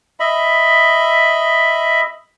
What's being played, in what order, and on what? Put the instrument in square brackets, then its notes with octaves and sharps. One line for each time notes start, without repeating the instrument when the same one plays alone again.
[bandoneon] D#5 E5 B5